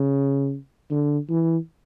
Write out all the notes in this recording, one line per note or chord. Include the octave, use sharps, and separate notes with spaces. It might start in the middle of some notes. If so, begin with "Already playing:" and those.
Already playing: C#3
D3
E3